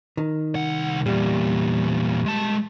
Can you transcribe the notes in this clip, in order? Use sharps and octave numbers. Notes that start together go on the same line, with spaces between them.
D#3
C2 F#5
E2 A#2 G3
G#3 A5